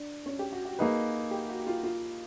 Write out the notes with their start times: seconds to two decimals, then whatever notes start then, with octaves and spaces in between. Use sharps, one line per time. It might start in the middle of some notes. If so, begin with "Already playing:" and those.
Already playing: D4
0.26 C#4
0.39 G4
0.52 F#4
0.65 F#4
0.79 A#3 D#4 G#4 B4
1.31 G4
1.49 F#4
1.67 F4
1.83 F4